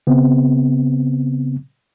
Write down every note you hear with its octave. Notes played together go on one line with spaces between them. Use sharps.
C#3 B3 C4